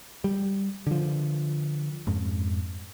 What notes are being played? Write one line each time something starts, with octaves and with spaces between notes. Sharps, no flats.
G3
D3 F3
F2 G#2